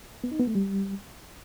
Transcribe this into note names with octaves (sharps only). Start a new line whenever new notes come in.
B3
D#4
B3
A3
G3